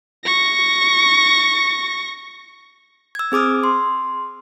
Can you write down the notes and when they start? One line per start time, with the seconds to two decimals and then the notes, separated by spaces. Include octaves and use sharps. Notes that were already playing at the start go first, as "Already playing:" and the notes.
0.25 C#6 A#6
3.15 E6 G#6
3.32 C4 G#4 D6 D#6 F6
3.64 C6